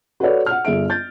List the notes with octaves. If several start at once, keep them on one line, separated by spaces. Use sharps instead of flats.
F#4 A4 B4 C#5 D5
F#5 F6
G1 G#4 E5 D7
G6 A6